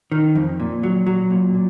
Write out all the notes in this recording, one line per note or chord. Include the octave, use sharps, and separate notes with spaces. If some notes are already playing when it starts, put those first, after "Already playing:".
D#3
F2
A#2
F#3
F#3
A#2
A#2